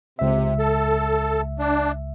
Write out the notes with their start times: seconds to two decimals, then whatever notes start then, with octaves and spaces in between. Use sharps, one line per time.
0.19 C#2 C3 E5
0.59 A4
1.59 D4